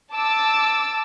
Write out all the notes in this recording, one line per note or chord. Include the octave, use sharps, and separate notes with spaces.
A5 D6 E6 A6